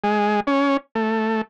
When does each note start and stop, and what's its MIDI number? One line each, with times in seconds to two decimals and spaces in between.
0.04 0.40 56
0.47 0.77 61
0.95 1.41 57